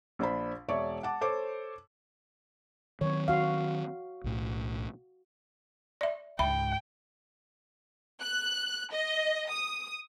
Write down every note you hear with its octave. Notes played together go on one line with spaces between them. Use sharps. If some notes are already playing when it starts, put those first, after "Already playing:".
A#1 D4 C5 B5
E1 C#5 D5 E5 C#6
F#5 A5 D6
A4 C5 C#5 A5 D6
D#3 F#3 C4 C#5
F#4 F5
B1 A2
D5 E5
C#2 G#2 E5 G5 B5
F#6
D#5
D#6